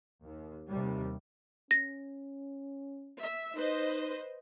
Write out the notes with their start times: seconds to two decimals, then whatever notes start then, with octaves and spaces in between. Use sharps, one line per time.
0.24 D#2
0.70 D#2 C3 G3
1.71 C#4 A#6
3.19 E5
3.55 D#4 B4 C5 D#5